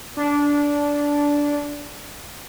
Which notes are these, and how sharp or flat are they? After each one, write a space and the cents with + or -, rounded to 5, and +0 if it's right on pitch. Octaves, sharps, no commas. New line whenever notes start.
D4 -15